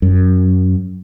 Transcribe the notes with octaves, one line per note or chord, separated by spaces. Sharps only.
F#2